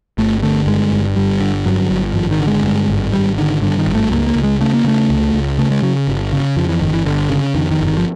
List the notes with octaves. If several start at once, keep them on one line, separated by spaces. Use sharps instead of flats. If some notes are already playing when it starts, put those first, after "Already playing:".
G1 A3
D3 A3
G2 G#3
G1
G1 G3
D3
G2 F#3
G1
G#1 F3
D#3
D3
G#3
G2
G#1
G#1 G3
D3 D#3
G2 D3
D#3
G#1
A3
C#2 A#3
A#3
C#2
G#3
C#3 A3
A#3
C#3 A3
C#2
C#2
C#3 A3
G#3
C#3 F#3
G1
C#3
F2 F3
E3
G1 D#3
E3
G1 D3
C#3
F2 D#3
D#3
G1
D#3
F3